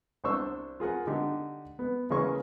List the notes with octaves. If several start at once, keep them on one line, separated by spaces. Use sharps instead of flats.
C2 D4 C5 C#6 E6
F4 G#4 A#4 F#5
D3 D#4 G4
B3
C#3 E3 A#3 C#4 G#4 C#6